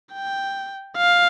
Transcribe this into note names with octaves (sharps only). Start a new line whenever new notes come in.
G5
F5